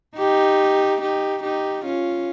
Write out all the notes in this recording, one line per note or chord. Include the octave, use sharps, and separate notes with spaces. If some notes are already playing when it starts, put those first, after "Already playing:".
D#4 G4
D#4 G4
D#4 G4
C#4 F4